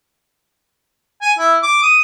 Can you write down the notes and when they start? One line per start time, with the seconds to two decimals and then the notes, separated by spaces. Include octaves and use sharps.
1.22 G#5
1.38 E4
1.63 D6
1.83 D#6